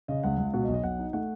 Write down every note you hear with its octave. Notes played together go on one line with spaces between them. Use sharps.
C#3 D#5
C#2 F#5
C#2
B2 F#5
D#5
B1
D#5
B1 F#5
D#4
A3 F#5